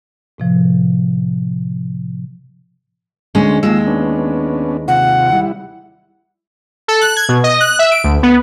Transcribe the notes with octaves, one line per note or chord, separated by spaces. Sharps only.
A2 C3 F3
D2 G#3 C#4
D#2 G#3 F4 E6
B3 C#4 D4
C3 F4 F#5
G3 E4
A4
F#6
G#6
B2
D#5
F#6
E5
D7
D2
B3